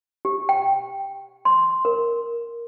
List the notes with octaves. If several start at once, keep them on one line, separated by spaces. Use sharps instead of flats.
G4
G5
C6
A#4